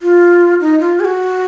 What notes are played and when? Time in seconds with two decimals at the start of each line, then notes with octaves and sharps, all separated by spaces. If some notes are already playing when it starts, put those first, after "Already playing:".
0.02 F4
0.61 D#4
0.80 F4
1.00 G#4
1.05 F#4